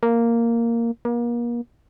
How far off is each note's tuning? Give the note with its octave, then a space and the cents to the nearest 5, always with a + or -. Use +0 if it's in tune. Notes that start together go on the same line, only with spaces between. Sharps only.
A#3 -5
A#3 +35